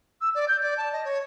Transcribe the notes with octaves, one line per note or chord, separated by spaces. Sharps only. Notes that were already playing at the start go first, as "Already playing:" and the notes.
E6
D5
G6
D5
A5
D#5
C#5